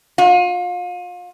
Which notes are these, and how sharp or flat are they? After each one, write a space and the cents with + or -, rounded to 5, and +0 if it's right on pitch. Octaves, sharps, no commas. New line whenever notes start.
F4 +35